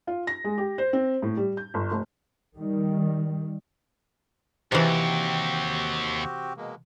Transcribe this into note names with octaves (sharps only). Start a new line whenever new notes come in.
F4
A#6
G#3
G4
C5
C4
A2
G3
G6
G1
F1
D#3 G3
D#2 C3 E3 C4 F#4 G4
B2 G#3 A#3